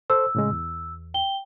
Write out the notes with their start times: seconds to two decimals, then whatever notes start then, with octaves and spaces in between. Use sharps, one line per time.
0.10 A4 C5 E6
0.35 A2 C#3 G#3
0.52 E2
1.14 G5 G7